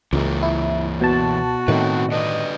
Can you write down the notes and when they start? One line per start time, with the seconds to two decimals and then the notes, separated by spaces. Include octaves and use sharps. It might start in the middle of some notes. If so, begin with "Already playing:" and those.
0.13 C#2 E3 A#3
0.43 E4
1.01 B2 F#4 A5
1.68 A2 D#3 C4 B4
2.12 D3 B4 D5 D#5